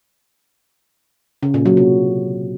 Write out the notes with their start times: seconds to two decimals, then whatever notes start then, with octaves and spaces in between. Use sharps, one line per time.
1.43 C#3
1.54 A#2
1.66 F#3
1.77 C3